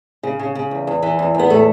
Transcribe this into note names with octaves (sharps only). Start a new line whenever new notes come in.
C#3
C#3
C#3
E2
E2
E3
E2
E2 B3
A2 A3